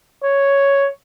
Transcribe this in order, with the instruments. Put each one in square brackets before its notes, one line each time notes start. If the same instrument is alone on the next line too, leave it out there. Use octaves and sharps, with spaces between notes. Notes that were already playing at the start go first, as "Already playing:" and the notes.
[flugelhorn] C#5